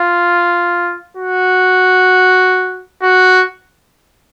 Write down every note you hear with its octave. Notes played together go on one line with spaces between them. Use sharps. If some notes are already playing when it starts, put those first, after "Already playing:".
Already playing: F4
F#4
F#4